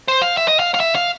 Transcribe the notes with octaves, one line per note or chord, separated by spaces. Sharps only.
C5
F5
E5
D#5
F5
F5
E5
F5